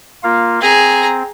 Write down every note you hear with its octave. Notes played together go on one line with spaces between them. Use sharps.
A#3 F4 F5
C4 G#4 A#5